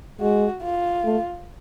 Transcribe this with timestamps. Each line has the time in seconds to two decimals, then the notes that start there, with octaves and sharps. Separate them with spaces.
0.20 G#3 F#4
0.62 F4
1.04 A3